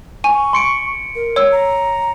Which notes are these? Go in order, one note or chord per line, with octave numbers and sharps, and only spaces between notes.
G#5 C#6
C6 C#7 D7
A#4
C#5 E6
A#5